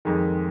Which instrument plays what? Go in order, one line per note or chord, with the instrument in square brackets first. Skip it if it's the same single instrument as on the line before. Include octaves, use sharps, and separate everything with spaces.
[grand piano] F2 D#3 G#3